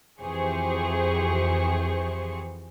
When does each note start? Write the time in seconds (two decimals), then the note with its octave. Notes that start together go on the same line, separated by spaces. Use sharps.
0.20 F2 E3 G4 G#4 C5 C#6